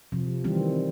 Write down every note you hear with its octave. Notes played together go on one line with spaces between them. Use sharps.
C3 F3
D#3 E3 G3 C4